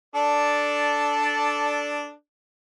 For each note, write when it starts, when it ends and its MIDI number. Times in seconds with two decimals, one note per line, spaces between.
0.15 2.12 62
0.15 2.12 69
0.15 2.12 74